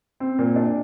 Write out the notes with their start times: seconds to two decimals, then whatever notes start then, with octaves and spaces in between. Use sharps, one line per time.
0.20 C4
0.39 A#2
0.56 D4